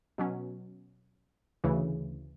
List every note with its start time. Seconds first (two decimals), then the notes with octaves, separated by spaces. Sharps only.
0.18 B2 F#3 C#4
1.64 D2 C#3 E3